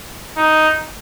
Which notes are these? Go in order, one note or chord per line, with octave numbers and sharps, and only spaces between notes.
D#4